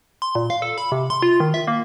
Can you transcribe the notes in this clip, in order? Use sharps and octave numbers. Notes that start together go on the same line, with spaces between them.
C6
A#2
F5
A4
B5
C3
C6
F4
D#3
E5
A#3